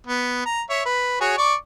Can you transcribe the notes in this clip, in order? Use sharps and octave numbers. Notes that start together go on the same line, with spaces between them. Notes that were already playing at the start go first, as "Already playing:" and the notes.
B3
A#5
C#5 E5
B4
F#4 G#4 C#5
D5 C#6 D6